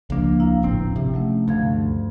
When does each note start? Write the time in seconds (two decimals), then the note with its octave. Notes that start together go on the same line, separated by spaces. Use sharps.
0.10 C#2 F3 A#3 D4
0.40 E4 F5 A#5
0.62 D1 G#1 C4
0.96 C3
1.14 F#3 A3 C#4
1.48 D2 G2 F5 G#6